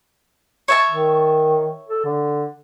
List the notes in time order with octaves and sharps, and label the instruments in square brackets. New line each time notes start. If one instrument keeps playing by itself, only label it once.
[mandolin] C#5 E5 A5
[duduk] D#3
A4
D3